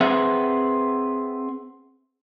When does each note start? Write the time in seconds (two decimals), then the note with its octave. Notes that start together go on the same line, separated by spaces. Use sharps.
0.01 C4 G#4 B4 E5 F#5